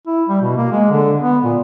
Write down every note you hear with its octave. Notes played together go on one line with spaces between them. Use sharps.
E4
G3
B2
A#3
G#3
D3
B3
A#2